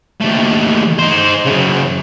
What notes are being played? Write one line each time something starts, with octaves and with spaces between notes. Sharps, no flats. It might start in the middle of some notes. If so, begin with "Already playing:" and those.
D#2 A3
D#4 C5
F#2 C#3